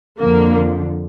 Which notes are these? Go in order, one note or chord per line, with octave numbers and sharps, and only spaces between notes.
F2 D3 F3 A#3